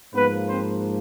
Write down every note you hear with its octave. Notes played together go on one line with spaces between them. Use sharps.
G#2 F3 A#3 B3 B4
C4 C5